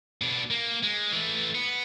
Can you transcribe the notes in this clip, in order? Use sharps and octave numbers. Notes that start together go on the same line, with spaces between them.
B2 D4
A#3
G#3
E3 A3
B3